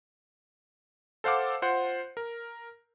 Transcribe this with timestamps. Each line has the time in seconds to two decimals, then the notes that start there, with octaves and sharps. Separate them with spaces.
1.24 A4 C5 F5 F#5 D6
1.62 F4 C5 F#5
2.17 A#4